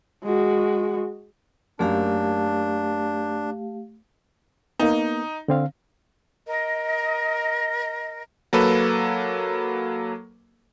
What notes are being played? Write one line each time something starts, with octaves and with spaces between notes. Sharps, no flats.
G#3 F#4
F#2 A3 A#3 D4 G4 F5
A#3 B3 D#4
D3 C4 F5
A#4 D#5
F#3 A#3 A4 B4